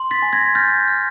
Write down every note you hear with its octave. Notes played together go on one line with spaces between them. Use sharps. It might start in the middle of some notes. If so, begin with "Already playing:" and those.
Already playing: C6
A6 B6
G#5
G#6 A#6
F6 G6 A6
F6